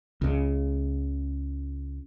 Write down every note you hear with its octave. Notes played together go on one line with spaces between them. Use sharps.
C#2 C#3